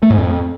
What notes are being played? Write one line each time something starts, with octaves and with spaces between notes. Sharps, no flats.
A3
G#2
F2